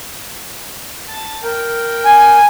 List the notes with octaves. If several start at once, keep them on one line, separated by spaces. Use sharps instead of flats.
A5
A#4 G5
G#5